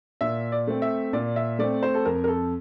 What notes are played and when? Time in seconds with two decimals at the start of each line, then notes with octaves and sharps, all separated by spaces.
0.21 A#2 E5
0.52 D5
0.67 A3 C4
0.82 E5
1.13 A#2 D5
1.36 E5
1.59 A3 C4 D5
1.83 C5
1.94 A4
2.05 F2 A#4
2.24 A#4
2.28 A4